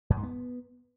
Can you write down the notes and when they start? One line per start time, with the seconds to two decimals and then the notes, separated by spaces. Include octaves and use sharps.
0.10 F#2
0.17 G#2
0.23 B3